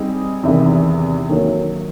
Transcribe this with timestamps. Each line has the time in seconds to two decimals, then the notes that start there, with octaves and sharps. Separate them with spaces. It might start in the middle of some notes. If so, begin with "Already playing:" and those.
Already playing: G3 C4 D#4 G#4
0.43 E2 C3 D#3
1.29 D#3 F#3 A#3